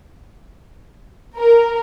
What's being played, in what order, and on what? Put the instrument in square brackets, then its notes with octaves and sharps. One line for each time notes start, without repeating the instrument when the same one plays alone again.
[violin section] A#4